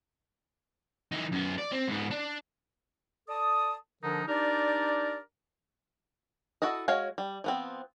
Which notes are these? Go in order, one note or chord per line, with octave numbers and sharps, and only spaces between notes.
E3 D#4
F#2 B3
D5
C4
G#2 B3
D4
A4 D5 A5 D#6
D3 F3 D4 D#4 G#4 A#4
D4 D#4 G4 A#4 D5
E4 F#4 A4 D#5
G#3 F#4 C#5 F5
G3
F3 B3 C4